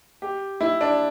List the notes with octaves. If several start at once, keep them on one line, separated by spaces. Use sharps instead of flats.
G4
E4
D4